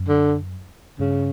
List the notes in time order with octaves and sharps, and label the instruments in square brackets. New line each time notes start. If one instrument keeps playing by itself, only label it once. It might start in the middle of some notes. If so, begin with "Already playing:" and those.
Already playing: [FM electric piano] F#2
[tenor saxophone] D3
[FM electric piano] G2 [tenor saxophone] C#3